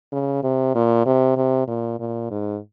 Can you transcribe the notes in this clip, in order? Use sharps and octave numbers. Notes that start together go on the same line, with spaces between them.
C#3
C3
A#2
C3
C3
A#2
A#2
G#2